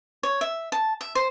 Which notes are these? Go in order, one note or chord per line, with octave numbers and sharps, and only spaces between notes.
C#5
E5
A5
E5
C5